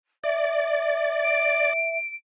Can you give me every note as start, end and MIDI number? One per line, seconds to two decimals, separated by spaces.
0.24 1.73 74
0.24 1.97 76
1.23 2.14 98